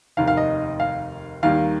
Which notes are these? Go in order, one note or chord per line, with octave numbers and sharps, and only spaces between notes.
F1 D#2 D#3 F5
F5
D#5
F5
D#2 D#3 G3 A#3 F5